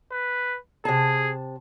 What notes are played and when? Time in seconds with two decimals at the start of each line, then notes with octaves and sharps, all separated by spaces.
0.11 B4
0.85 C3 G#4 A5